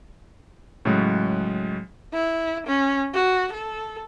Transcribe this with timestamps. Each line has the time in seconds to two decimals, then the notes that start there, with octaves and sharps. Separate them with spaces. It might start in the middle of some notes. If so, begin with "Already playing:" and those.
0.85 A2 C#3 F#3 G#3
2.13 E4
2.67 C#4
3.14 F#4
3.52 A4